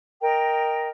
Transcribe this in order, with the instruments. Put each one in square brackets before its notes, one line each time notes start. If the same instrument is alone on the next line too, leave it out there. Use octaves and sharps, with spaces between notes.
[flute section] A#4 D#5 G5